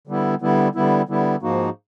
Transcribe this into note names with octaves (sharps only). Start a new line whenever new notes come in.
D3 G3 B3 E4
D3 G3 B3 E4
D3 G3 B3 E4
D3 G3 B3 E4
G#2 F3 A#3 D#4 F#4